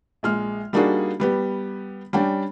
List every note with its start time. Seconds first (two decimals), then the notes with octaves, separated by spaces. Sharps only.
0.23 A#1 G#3 F6
0.73 G3 A#3 D4 D#4 F#4 G#4
1.20 G3 B3 G4
2.13 G3 C#4 D4 G5